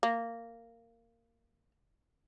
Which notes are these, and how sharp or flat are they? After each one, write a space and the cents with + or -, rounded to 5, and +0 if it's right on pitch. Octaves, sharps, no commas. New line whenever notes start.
A#3 -15